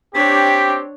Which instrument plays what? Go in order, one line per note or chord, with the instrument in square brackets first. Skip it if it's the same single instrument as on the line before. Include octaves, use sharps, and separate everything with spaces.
[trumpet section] C4 G4 [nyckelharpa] D4 C#5 [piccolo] B6